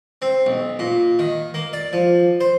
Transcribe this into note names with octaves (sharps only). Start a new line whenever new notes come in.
C4
B1
A#2
D#3
A#3
D5
F3
C5